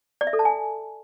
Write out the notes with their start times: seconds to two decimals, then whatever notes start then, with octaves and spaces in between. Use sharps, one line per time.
0.21 D5
0.27 E5
0.33 A4
0.39 A5
0.45 G#5